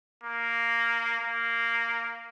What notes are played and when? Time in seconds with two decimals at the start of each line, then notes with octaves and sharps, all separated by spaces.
0.24 A#3
1.20 A#3